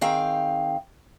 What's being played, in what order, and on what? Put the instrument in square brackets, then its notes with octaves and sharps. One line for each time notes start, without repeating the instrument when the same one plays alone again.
[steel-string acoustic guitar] D#3 C4 G#4 F5 G5